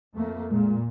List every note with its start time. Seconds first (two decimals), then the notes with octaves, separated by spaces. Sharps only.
0.16 F2 A3 A#3
0.51 A#2 G#3